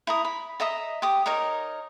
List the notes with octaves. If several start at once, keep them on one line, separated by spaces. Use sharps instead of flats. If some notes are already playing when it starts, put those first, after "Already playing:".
E4 A#5 D#6
B5
D#5 E5 A#5 D#6
G4 D6 D#6
D#4 A#4 C#5 D#5